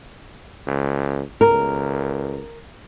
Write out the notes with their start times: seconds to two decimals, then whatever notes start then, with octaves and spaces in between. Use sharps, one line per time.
0.67 C#2
1.41 C#2 A#4